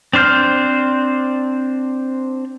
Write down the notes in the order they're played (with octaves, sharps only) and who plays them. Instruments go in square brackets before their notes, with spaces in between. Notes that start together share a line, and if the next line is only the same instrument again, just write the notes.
[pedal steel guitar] C4 D4 C5 F6 G6